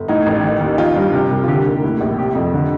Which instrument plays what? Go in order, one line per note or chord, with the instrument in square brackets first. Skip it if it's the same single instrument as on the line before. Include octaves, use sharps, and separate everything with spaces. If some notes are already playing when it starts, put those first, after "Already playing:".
Already playing: [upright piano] G1
A2 D#4
A1
D#3
D#2
D#3 F4
G2
C3
C2
F4
D3 G4
D#2
A2
A#1
C3 G4
F2
D3